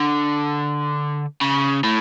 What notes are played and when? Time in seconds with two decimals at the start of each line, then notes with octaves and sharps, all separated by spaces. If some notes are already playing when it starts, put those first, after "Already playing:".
Already playing: D3
1.41 C#3
1.84 A2